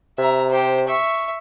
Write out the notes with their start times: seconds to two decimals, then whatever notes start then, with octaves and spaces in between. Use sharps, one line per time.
0.18 C3 E5 A#5
0.50 G4 C5
0.87 E5 C#6